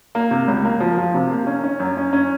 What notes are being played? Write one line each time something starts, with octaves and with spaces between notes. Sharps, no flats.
A#3
C3
C#2
A#3
F3
F3
C3
A#3
C#4
C#4
F#2
C#4
C#4